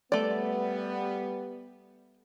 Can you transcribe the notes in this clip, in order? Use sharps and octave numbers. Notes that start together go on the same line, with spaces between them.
G3 A3 B3 D5